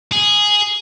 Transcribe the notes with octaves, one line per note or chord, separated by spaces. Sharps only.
G#4